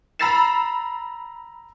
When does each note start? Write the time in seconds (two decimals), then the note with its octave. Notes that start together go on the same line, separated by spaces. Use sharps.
0.19 A#5 B5 E6 A6 C7 E7